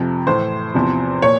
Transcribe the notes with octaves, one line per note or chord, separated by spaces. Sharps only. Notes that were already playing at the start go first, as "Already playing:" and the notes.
Already playing: F2 C3 F3
A2 E3 C5
E2 C3 F3
A#2 C#5